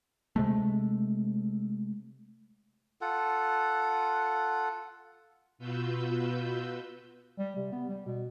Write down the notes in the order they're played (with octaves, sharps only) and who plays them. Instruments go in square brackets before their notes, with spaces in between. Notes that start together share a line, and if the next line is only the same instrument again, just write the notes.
[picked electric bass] C3 G#3 A3
[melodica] F4 A4 F#5
[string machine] B2 F4 F#4 B4 E6 G6
[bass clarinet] G3
C3
B3
G3
B2